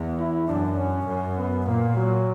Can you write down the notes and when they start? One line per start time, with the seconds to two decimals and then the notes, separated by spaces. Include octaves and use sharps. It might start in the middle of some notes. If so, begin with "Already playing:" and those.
Already playing: E2
0.20 E4
0.48 F#2 D4
0.78 C#4
1.07 F#2
1.37 B3
1.66 A#2 A#3
1.95 F#3